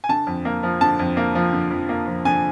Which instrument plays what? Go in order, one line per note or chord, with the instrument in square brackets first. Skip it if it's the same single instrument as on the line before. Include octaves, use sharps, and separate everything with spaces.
[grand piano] G#5
D3 A5
F2
A#3
F3
D3 A5
F2
A#3
F3
D3
F2
A#3
F3
D3 G#5